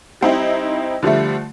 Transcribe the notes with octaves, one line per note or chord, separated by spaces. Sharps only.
G3 C4 D#4 E4
D3 F3 G3 A3